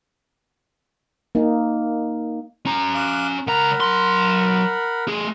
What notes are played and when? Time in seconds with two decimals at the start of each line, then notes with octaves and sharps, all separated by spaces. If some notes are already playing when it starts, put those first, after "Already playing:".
1.35 A#3 D#4
2.66 C#4 A#5
2.94 F5 D6 F#6
3.47 C#2 A#4 F#5 A#5 B5
3.80 F#3 C6
5.08 A3 G#4